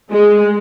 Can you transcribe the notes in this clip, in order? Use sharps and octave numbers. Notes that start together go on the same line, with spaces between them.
G#3